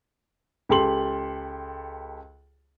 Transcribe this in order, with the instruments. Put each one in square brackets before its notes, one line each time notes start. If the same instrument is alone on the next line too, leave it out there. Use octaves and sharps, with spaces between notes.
[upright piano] C#2 G4 A4 C6 F#7